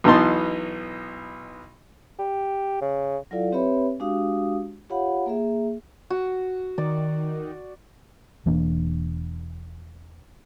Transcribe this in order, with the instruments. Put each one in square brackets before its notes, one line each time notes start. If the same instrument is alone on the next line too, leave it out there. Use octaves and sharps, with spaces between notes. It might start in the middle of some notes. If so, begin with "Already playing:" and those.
[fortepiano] B1 B2 E3 D#4 A5 C6
[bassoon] G4
C#3
[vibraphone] F#3 E4 F4 A4 D5 F5
C4 G4 B4 C#5 E5 B5
G#3 D4 F#4 G4 F5 D#6
F4 G4 C#5 F5 F#5 B5
A#3 G#4 E5
[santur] F#4
[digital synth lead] D#3 [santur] D5
[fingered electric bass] E1 E3 A#3 D4